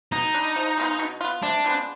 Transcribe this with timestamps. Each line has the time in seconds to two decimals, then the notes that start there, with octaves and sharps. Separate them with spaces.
0.12 B2 D#4
0.34 G3 D4
0.56 F3
0.78 G#3 B3 F4
0.99 B2
1.21 B3 F4
1.43 C3 D4
1.64 F3 G#3 B3